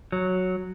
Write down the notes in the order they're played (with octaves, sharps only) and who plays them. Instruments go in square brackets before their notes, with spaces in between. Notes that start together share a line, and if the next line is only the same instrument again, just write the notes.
[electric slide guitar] F#3